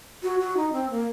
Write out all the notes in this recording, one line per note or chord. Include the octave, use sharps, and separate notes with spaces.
F#4
F#4
D#4
C4
A#3